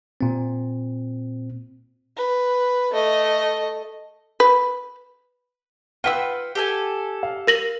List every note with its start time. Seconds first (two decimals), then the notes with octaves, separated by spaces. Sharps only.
0.21 A#2 C4
2.17 B4
2.92 A3 D#5
4.40 B4
6.04 F4 B4 F#5 G5 E6
6.55 G4 A4 G#5
7.23 F5
7.47 A#4 A#6 F#7